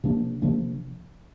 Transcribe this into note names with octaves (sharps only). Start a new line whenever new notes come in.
C3 F3 A#3 D4
C3 F3 A#3 D4